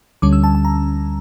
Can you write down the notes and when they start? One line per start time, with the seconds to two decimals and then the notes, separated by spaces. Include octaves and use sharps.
0.22 D2 D3 G3 C#4 D6
0.33 E6
0.44 A5
0.55 A5
0.65 A#5